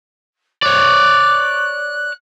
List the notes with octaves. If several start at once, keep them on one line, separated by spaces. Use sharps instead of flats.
C#5 D5 F#6